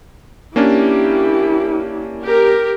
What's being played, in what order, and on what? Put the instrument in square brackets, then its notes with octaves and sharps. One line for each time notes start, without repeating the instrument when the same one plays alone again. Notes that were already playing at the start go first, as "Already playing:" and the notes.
[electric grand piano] A#3 C#4 D4 [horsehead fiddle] E4 G4
[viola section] G4 A#4